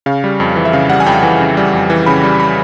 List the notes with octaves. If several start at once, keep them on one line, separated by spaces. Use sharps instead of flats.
C#3 F5
G3
F2
E3
E5
C#3 F5
G3 F#5
G#5
F2 G5
E3 G#5
C#3
G3
F2
E3
C#3 B5
G3
B5